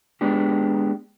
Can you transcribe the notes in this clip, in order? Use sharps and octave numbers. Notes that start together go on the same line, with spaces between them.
G#3 B3 D4 G4